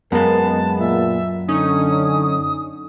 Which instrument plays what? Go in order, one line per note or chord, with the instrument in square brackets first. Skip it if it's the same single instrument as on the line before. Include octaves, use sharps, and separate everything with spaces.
[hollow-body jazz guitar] F#2 A#3 [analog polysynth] G#3 B3 [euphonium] A#4 [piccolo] A5
[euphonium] A#2 [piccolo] E5
[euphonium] D3 [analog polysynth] C#4 D#4 [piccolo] D#6